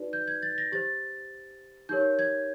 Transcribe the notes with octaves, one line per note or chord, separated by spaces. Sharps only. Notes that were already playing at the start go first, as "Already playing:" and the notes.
Already playing: D#4 F#4 B4 D5
G6
G#6
A6
A#6
G4 C5 A6
D#4 G4 A#4 C#5 G6
G#6